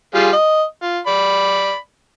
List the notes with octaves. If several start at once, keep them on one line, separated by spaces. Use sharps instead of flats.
G3 F4 G#4
D#5
F4
D5 B5